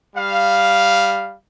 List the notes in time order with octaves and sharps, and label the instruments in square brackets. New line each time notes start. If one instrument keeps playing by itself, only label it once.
[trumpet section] G3 F5